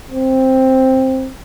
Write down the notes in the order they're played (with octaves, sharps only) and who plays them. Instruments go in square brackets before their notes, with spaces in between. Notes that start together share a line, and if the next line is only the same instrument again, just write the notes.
[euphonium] C4